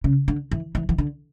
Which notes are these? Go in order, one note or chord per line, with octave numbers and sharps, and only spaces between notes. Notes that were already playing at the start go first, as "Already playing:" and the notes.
C#3
D3
E3
E3
E3
D3